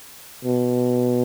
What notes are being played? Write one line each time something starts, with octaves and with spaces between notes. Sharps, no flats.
B2